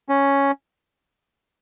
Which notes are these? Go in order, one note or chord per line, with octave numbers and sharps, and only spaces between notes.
C#4